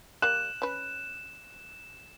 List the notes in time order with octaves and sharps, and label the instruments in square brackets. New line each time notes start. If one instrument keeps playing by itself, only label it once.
[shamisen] G3 A#3 D5 [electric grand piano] F#6 [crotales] E7
[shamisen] C#4 B4